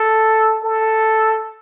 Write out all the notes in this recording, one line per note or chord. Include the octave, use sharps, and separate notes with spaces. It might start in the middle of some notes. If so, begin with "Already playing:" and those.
Already playing: A4
A4